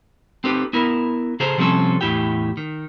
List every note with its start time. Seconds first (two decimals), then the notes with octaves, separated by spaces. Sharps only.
0.44 C4 D#4 G4 A4 B4
0.73 B3 E4 A#4
1.40 C#3 G#4 A4 C5 A#5
1.58 C3 F3 G3 C4 C#4 A4
2.01 E2 A2 E4 G4 G5
2.57 D#3